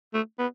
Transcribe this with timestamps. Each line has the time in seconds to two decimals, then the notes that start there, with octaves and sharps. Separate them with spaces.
0.14 A3
0.39 B3